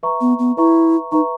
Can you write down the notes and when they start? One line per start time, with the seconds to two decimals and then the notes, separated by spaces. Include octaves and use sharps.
0.03 B4 E5 A#5 C#6
0.21 B3
0.39 B3
0.57 E4 B4 E5 A#5 C#6
1.12 D#4 B4 E5 A#5 C#6